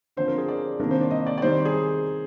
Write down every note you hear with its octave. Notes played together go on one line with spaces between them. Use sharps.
D3 F3 C4 C5
A#4
G#4
D5
C3 D#3 G3 A#3 D4 A#4
C5
D5
D#5
D5
D5
D#3 G3 C4 D#4 C5
G#4